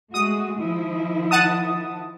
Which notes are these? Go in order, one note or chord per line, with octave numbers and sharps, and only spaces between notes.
G#3 A3 F#4 D#6
D#3 F3 E4
F#5 A5 D#6